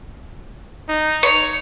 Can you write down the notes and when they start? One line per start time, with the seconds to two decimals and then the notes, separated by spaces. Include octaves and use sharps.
0.89 D#4
1.23 C#5